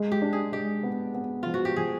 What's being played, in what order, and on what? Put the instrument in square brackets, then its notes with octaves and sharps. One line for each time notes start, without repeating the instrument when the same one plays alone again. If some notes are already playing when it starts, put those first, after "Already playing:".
Already playing: [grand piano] G#3
[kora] G4
[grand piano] D4
[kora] G#4
[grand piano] G#3 [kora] G4
[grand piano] B3
B3
[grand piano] F3 [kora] F4
[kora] F#4
G4
[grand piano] F3 [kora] G#4